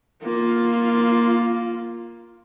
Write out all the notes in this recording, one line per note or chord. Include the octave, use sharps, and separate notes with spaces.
A#3 F4